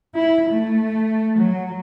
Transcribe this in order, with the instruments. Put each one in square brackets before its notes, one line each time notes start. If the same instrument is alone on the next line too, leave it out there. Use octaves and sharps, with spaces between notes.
[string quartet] E4
A3
F#3